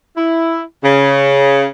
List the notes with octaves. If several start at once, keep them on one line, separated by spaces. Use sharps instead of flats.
E4
C#3